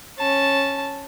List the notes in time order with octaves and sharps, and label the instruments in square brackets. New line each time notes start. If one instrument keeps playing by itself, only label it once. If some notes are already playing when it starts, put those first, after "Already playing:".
[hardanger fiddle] C#4 A5